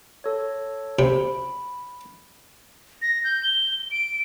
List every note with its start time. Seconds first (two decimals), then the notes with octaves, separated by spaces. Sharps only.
0.24 A4 C#5
0.99 C3 B5
3.02 A#6
3.24 G6
3.43 G7
3.91 D7